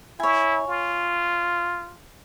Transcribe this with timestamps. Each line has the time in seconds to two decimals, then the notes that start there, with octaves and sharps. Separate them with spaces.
0.20 E4 C#5 G#5
0.68 F4